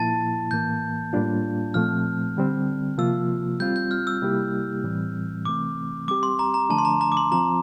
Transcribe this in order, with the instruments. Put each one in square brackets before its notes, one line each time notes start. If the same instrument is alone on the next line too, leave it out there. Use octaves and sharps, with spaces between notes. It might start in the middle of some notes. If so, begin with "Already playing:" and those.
Already playing: [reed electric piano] A#2 F3 A#3 E4 [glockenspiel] A5 A6
[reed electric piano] A2 E3 A#3 [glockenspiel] G6
[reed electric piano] A2 G3 A#3 D4 F4
[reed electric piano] A#2 F3 A3 C4 [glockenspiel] F6
[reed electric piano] D3 G3 C4
[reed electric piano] C3 F3 A#3 F4 [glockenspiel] E6
[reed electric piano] G3 C4 F4 [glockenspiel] G6
[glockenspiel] G6
F6
E6
[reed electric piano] C3 G3 A#3 E4 G4
A2 E3 G3 C4
[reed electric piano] C3 E3 A3 C4 [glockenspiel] D6
[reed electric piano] G3 C4 G4 [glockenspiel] D6
[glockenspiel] C6
A#5
A#5
[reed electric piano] D3 F3 A3 D4 [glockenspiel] A5
[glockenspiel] C6
A#5
A#5
D6
C6
[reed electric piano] F3 C4 F4 [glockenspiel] A#5